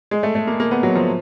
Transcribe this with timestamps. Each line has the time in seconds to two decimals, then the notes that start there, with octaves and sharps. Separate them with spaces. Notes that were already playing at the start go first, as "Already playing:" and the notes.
0.11 G#3
0.23 A3
0.35 A3
0.47 A#3
0.60 A#3
0.71 B3
0.83 F#3
0.95 F3